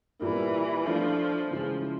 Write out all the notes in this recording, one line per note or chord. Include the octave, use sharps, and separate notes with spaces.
A#2 E3 G3 A#3
F3 A3 D4 F4
C#3 E3 F3 G#3